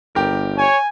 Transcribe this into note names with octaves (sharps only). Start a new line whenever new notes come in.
G1 G4 A#4
C#5 G#5